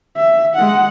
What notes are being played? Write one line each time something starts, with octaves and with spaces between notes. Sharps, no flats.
E5
G#3 F#5